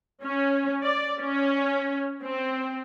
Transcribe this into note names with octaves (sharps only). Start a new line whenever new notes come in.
C#4
D5
C#4
C4